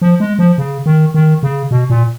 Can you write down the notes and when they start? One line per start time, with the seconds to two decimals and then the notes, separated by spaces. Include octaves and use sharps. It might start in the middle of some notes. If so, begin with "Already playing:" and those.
0.02 F3
0.20 G#3
0.39 F3
0.58 C#3
0.86 D#3
1.14 D#3
1.43 C#3
1.71 B2
1.90 A#2